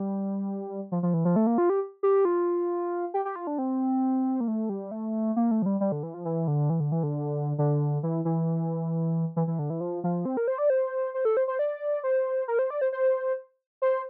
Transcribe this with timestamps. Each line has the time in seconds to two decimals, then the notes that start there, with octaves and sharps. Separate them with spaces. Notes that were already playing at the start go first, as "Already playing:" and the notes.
Already playing: G3
0.92 F3
1.03 F3
1.14 E3
1.25 F3
1.36 A3
1.47 A#3
1.58 F4
1.70 G4
2.03 G4
2.25 F4
3.14 G4
3.25 G4
3.36 F4
3.47 D4
3.58 C4
4.40 A#3
4.48 A3
4.69 G3
4.91 A3
5.36 A#3
5.51 A3
5.62 F3
5.66 G3
5.80 G3
5.92 D3
6.03 E3
6.14 F3
6.25 E3
6.48 D3
6.70 E3
6.80 D3
6.92 E3
7.03 D3
7.58 D3
8.03 E3
8.25 E3
9.36 E3
9.47 E3
9.59 D3
9.70 E3
9.81 F3
10.04 F3
10.25 C4
10.37 A#4
10.48 C5
10.58 D5
10.70 C5
11.14 C5
11.25 A4
11.37 C5
11.48 C5
11.59 D5
12.04 C5
12.48 A#4
12.59 C5
12.70 D5
12.81 C5
12.92 C5
13.82 C5